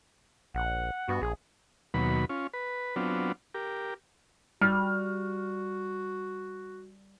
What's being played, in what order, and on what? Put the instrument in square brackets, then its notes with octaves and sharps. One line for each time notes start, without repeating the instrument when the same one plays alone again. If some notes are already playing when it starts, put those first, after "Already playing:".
[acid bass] A#1 [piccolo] F#5
[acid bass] G2 [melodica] B3 F#4
[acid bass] A#1 [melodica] G#4
[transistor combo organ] D#2 B2 F#3 B5
C#4 F4
B4
F#3 B3 C4 D4 F4
G4 A#4
[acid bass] G3 [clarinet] F#4 [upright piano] F6